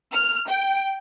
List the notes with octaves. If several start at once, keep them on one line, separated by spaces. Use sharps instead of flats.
F6
G5